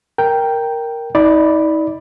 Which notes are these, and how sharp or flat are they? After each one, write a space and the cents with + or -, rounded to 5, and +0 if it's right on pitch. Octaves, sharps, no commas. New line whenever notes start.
A#4 +0 G5 +0
D#4 +40 D5 +0 B5 +0